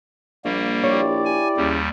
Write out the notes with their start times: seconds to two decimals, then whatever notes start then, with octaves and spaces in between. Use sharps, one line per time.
0.45 A#1 G3 A#3
0.84 E4 G4 C#5 D5
1.25 G#5
1.57 D#2 C#3 G3